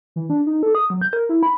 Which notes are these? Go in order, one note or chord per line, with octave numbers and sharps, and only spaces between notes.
E3
D4
D#4
A4
D#6
F#3
G6
A#4
E4
B5